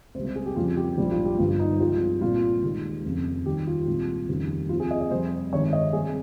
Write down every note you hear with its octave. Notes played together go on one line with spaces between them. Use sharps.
C#2 C3 G3 C5
C5
G#4
G4
F2 C#3 G3 F4
G4
A#1 G#2 G3 F4
F4
G4
G1 G2 G3 F4
D#4
C2 C3 F3 G#3 F4
C2 A#2 G3 F4
D#2 D#3 G#3
F1 F2 C#3
D#2 D#3 G3 G4
F4
C2 A#2 G#3
F1 D#2 C#3 G3
F2 C3 F3 F4
G#4
D#5
D#5
F2 C3 G3 C5
G#1 G2 D#3 G#3 C#5
D#5
C3 G3 G#4